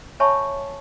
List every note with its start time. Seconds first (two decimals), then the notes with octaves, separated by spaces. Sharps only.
0.20 C#5 E5 G#5 A5 B5 C#6